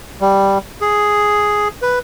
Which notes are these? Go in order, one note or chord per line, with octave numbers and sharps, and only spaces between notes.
G3
G#4
B4